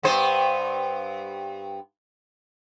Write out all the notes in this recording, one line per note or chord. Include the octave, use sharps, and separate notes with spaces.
G2 B3 C5